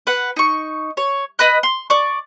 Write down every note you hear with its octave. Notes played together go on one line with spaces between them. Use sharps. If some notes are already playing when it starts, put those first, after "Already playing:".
B4 F#5
D#4 C#6
C#5
B4 D#5 B5 F#6
C6
D5 C#6